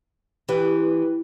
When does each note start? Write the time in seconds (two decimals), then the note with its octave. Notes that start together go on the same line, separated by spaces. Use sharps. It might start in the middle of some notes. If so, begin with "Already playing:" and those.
0.49 E3 G4 B4